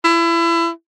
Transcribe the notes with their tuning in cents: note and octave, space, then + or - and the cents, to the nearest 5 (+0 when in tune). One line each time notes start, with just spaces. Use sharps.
E4 +30